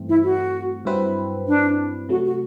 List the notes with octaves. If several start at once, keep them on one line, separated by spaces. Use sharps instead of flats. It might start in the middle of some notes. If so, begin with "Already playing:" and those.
Already playing: G2 E3 A3 C4
E4
F#4
G2 F#3 C4 E4 B4
D4
C3 F#3 A3 F#4
F#4